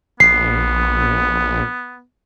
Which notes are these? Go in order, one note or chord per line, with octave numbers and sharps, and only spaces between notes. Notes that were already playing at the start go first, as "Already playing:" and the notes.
A#1 B3 C7